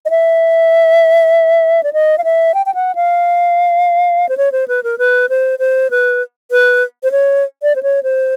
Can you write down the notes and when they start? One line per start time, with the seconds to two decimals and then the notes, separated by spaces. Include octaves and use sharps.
0.05 D#5
0.10 E5
1.83 D5
1.93 D#5
2.18 F5
2.24 E5
2.54 G5
2.66 G5
2.75 F#5
2.95 F5
4.29 C5
4.37 C#5
4.52 C5
4.68 B4
4.83 A#4
4.98 B4
5.29 C5
5.59 C5
5.91 B4
6.51 B4
7.03 C5
7.12 C#5
7.63 D5
7.75 C5
7.83 C#5
8.03 C5